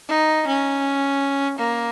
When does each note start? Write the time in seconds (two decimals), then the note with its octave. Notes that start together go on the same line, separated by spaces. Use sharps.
0.09 D#4
0.47 C#4
1.58 A#3